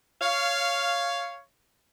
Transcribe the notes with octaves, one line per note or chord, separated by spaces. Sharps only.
C#5 F5